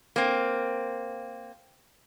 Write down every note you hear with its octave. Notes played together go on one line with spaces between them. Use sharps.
A#3 C4